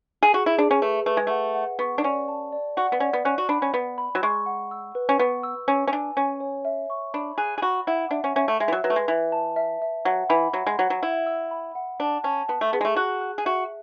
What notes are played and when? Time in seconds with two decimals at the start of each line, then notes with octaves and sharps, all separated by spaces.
0.23 G#4
0.33 F#4 G#4
0.46 E4
0.57 D4 G#4
0.71 C#4
0.82 A3 B4
1.06 A3 B4
1.17 G#3
1.27 A3 F#5
1.55 F#5
1.79 B3 C#6
1.98 D4
2.03 C#4 D5
2.28 A5
2.52 D5
2.77 F#4 F#5
2.92 B3
3.00 C#4 D5
3.13 B3
3.25 C#4 F#6
3.38 F#4
3.49 D4 B5
3.62 C#4
3.74 B3 B5
3.98 B5
4.15 F#3
4.23 G#3 C#6
4.46 F#5
4.71 E6
4.95 B4
5.09 C#4
5.19 B3 C#6
5.43 E6
5.68 C#4 E6
5.87 C#4
5.92 D4 G#5
6.16 C#4 G#5
6.40 C#5
6.65 E5
6.90 C#6
7.14 D4 B5
7.38 G#4 F#6
7.58 G#4
7.62 F#4 B5
7.87 E4 F#5
8.11 D4 E5
8.24 C#4
8.36 C#4 E5
8.48 A3
8.60 G#3 E5
8.68 E3
8.72 F#3
8.84 F#3 B4
8.90 A3
8.96 G#3
9.08 E3 E5
9.32 A5
9.56 E5
9.82 E5
10.05 F#3 F#5
10.30 E3 B5
10.53 F#3 F#5
10.67 G#3
10.79 F#3 F#5
10.90 F#3
11.03 E4 F#5
11.26 E6
11.51 B5
11.75 F#5
12.00 D4 A5
12.24 C#4 A5
12.49 B3 A5
12.61 A3
12.73 B3 G#4
12.81 G#3
12.85 A3
12.96 F#4 F#6
13.21 F#6
13.38 G#4
13.45 F#4 E5